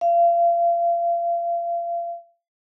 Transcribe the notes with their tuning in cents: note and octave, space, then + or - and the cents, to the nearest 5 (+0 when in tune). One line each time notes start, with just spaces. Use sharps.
F5 -35